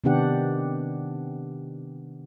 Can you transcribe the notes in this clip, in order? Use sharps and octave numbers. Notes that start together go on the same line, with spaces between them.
C3 D#3 B3 D4 G4 F#5